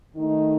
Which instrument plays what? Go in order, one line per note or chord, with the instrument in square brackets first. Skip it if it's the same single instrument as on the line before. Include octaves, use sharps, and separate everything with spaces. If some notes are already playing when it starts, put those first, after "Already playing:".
[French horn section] D#3 A3 D#4